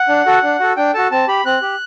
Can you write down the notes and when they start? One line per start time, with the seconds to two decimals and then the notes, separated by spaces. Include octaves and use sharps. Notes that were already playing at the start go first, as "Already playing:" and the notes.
Already playing: F#5
0.09 D4
0.26 F#4 A4
0.43 D4
0.60 F#4 A4
0.77 D4 G5
0.94 F#4 A4 A5
1.11 C4 A5
1.28 G4 B5
1.45 C4 F#6
1.62 G4